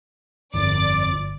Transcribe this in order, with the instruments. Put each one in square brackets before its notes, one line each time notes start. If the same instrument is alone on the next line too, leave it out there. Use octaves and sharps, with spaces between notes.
[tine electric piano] G1 [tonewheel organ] F2 [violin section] D5 A6 [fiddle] D6